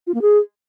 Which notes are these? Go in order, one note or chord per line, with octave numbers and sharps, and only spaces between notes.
F4
A#3
G#4